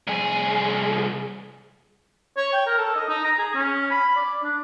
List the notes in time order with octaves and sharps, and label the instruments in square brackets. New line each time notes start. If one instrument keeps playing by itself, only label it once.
[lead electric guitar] C2 G#4
[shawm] C#5
G5
A#4
A4
D#5
D#4
A#5
G#4
C#4
B5
D5
D4